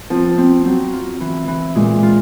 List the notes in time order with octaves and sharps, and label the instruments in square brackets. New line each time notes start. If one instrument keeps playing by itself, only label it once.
[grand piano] F3 [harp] C4
[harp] C4
[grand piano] F#3 [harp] C4
[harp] F4
E3
E3
[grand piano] A#2 [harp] G#3
[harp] F4